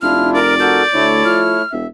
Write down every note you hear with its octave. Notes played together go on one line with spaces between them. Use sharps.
F1 D4 E4 F4 F6
A#4 D5
F#4 A4 A#4 G6
D2 A3 E4 C#5
F3 F6
E1 E5